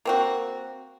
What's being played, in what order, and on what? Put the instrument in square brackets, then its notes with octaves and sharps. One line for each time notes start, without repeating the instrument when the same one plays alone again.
[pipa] A#3 C4 F#4